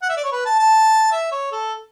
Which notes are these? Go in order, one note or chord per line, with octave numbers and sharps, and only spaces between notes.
F#5
E5
D5
C#5
B4
A5
A5
E5
C#5
A4